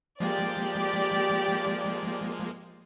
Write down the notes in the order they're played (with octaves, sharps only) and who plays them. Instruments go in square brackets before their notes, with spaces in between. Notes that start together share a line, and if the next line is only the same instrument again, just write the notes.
[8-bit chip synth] F3 G#3 A#3 [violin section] G4 D5